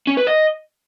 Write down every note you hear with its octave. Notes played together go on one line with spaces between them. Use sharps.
C#4
B4
D#5